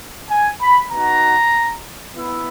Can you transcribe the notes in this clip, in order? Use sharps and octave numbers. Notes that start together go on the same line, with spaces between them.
G#5
B5
B3 D#4 F#4 A#5
B3 E4